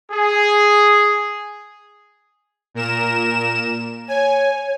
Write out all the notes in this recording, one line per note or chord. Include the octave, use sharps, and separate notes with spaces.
G#4
A#2 A#4 E7
C#5 G#5